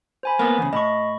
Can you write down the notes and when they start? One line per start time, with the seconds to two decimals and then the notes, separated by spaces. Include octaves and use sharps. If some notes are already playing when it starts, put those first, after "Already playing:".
0.23 C5 G#5 B5
0.39 A#3 B3 B5 D#6
0.58 E2 C#3
0.73 A2 D#5 B5 C#6